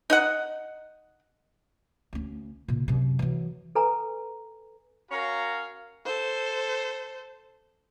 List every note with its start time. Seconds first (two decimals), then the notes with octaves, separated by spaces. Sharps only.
0.10 D#4 D#5 F#5
2.13 D2 C#4
2.68 A#2 C#3
2.88 F#2 C3
3.19 E3 F#3
3.75 A4 B4 G#5 A#5
5.11 C#4 F#4 A#4 C#5 F5 A#5
6.06 A4 C5